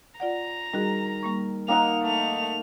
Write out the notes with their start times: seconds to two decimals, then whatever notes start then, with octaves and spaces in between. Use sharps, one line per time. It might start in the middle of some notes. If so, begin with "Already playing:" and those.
0.20 F4 D5 F#5 A#5
0.73 D#3 G3 F#4 G#4
1.23 G3 A#3 C#6
1.68 A#3 D#4 F#5 G5 F7
2.03 A3 F7